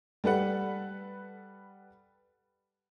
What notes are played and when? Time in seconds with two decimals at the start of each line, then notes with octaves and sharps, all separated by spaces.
0.24 G3 A4 B4 F#5